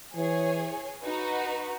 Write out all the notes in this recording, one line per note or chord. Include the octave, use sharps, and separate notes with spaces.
E3 G#4 C#5 G#5
D#4 F#4 B4